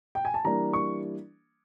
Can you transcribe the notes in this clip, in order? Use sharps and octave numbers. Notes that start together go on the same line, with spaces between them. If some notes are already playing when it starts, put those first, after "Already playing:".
G5
G#5
A5
E3 G3 A#3 D4 A#5
C#6